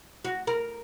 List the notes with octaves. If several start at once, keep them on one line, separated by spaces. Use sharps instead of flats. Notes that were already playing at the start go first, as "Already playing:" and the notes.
F#4
A#4